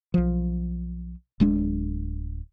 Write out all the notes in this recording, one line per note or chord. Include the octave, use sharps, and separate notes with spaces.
B1 F3
D1 G#3 D4